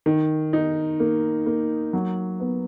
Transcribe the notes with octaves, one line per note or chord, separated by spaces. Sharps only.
D#3
D#4
A#3
A#3
F#3
B3